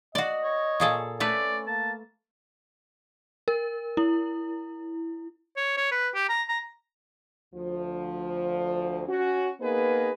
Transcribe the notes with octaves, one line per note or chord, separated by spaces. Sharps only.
F#4 D5 D#5
C#5
A#2 G#4 A4
A3 C#4 B4 D5
A#3 A5
A#4
E4
C#5
C#5
B4
G4
A#5
A#5
D2 F3
C#4 F#4
A#3 B3 D#4 G#4 A#4 B4